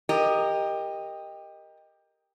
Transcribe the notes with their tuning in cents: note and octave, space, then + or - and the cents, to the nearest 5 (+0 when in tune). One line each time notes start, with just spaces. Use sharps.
G4 +15 A#4 +0 D#5 +0